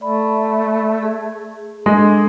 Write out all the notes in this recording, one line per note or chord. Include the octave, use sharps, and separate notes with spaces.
A3 D5 B5
G#4
G#3 D4 G#4 A4 D#5